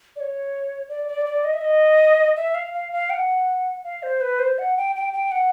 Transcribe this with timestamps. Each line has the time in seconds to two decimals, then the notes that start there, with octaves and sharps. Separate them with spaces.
0.16 D5
0.20 C#5
0.89 D5
1.08 D5
1.26 D5
1.44 D#5
1.54 E5
1.61 D#5
2.36 E5
2.55 F5
2.74 F5
2.93 F5
3.10 G5
3.14 F#5
3.84 F5
4.03 C5
4.21 B4
4.39 C5
4.58 F#5
4.77 G5
4.96 G5
5.13 G5
5.32 F#5